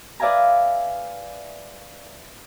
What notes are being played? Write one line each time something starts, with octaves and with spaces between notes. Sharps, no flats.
B4 D5 E5 F5 G#5 A#5